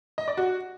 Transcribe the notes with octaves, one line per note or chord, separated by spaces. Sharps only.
D#5
D5
F#4